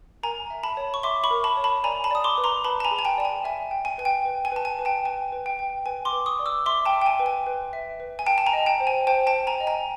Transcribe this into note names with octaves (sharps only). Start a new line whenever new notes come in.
A#4 G#5 A#5
E5
A5 B5
C#5
C#6
E5 C6 D6
B5 C#6
A#4
A5 B5
C#5
A5 B5
D5 G#5 A#5
A5 B5
D5 D#6
C6 D6
B4
A#5 C6
B4 A5 B5
A5
G#5 A#5
G#4
G#5
G5 A5
D5 A5
G#5
E5 G#5
G5
G#5
B4 G#5
G5
B4
G#5
B4 A5
G#5
B4
G5 A5
B4 G#5
B4
G5
G5
B4 G#5
C6 D6
B4
C#6 D#6
D5
D6 E6
E5 C6 D6
G5 A5
E5
G5
G#5
B4
G#5
B4
E5
B4
G#5
G5 A5
A5
G#5 A#5
D#5
G5 A5
C5
G#5
C5 G5 A5
G5 A5
C5
G#5 A#5
D#5
G#5 A#5